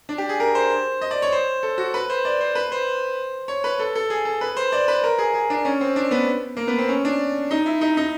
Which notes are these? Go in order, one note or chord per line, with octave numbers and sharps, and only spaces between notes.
D4
G4
G#4
A#4
C5
D#5
D5
C#5
C5
A4
F#4
B4
C5
D5
C5
B4
C5
C#5
B4
A4
A4
G#4
A4
B4
C5
D5
B4
A#4
G#4
G#4
D4
C#4
C4
D4
B3
A#3
B3
C4
C#4
D4
D#4
E4
D#4
D#4